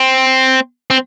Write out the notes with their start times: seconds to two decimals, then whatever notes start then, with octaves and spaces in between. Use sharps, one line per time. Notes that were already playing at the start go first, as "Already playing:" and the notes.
Already playing: C4
0.90 C4